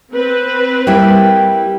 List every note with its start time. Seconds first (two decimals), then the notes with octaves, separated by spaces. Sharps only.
0.13 C4 B4
0.87 G3 A#3 E4